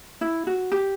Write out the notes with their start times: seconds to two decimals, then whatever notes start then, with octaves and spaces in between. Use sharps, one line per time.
0.21 E4
0.47 F#4
0.72 G4